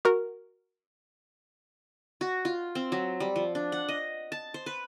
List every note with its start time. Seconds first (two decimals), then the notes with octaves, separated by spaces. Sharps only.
0.05 F#4 A#4
2.21 F#4
2.45 F4
2.75 C4
2.92 F#3
3.20 G3
3.36 F3
3.55 D4
3.72 F#5
3.88 D#5
4.32 A5
4.54 C5
4.66 B4